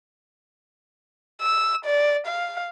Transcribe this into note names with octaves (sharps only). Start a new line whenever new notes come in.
E6
D5
F5